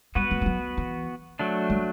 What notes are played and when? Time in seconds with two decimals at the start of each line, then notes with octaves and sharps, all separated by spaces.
0.15 G3 B3 F#4 B4
0.31 F#3
0.41 G3
0.46 F#3
0.77 E3
1.39 F#3 A3 D4
1.70 G3